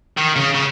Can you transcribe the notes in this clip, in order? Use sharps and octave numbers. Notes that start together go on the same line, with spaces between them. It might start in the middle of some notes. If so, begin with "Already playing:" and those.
D#3
C#3
C#3